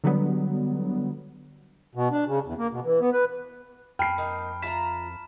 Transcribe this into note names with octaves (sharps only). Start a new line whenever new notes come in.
D3 F#3 G3 B3
B2
D4
C#3
E2
A#3
B2
E3
B3
B4
F2 G5 A5 B5 F6 C7
A#3 D#4
F4 E5 A#5 B6 E7